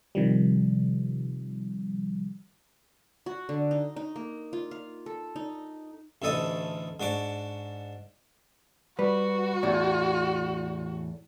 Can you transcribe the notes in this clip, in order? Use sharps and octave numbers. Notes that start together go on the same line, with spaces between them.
C3 D#3 F3 G3
F#4
D3
D#4
D#4
A#3
F4
F5
A4
D#4
A1 D2 E4 A4 D#5
G#2 D4 F#4 D6
G3 F#4 B4
E2 A2 D5